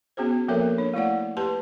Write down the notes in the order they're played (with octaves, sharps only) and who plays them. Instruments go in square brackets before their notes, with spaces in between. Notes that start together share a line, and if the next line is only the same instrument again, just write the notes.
[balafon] B3 C#4 F#4 G#4 C5
F3 A#3 A4 A#4 C#5 E5
D4 C#5
A3 E4 D5 F#5
G4 B4 A5 C6